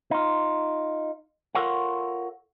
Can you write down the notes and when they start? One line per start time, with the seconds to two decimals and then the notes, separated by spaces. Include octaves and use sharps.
0.11 D#4 F4
1.55 F4 A4 A#4 C#5 F5 F#5